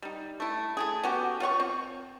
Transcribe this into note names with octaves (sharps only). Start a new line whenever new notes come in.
G3 D#4
A3 E4
A3 E4 G#4
B3 C#4 F#4 G4
F4 C#5 F#5 C#6
C4